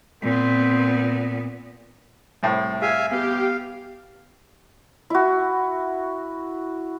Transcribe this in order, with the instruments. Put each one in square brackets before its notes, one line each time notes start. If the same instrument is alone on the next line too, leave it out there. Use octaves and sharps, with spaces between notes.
[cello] A#2 B3 [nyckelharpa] C4
[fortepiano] C2 A2
[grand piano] G#4 G#6 [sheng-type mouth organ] E5 F5 G#5
[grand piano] B3 [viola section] G4 [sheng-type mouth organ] F5
[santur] E4 F#4